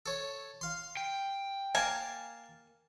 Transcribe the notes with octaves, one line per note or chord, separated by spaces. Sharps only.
A4 C#5
F5 C6
G5
A#3 F5 G#5 A5